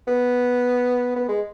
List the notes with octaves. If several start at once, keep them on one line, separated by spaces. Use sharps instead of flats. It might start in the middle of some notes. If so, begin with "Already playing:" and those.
B3
B3
G#3